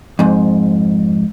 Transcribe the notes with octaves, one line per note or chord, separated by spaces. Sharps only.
F2 G#2